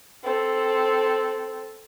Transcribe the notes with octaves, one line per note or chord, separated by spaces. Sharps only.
C4 A4